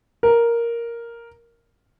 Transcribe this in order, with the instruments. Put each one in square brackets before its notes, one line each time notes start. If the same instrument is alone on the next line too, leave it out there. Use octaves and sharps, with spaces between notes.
[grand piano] A#4